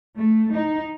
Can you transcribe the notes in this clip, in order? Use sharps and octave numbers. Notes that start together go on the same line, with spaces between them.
A3
D#4